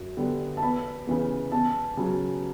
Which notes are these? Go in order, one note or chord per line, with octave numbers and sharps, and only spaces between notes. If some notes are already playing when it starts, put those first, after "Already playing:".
Already playing: F#2
D3 G3 B3
A5
E2 B5
C#3 E3 B3
E2 A5
C#3 F#3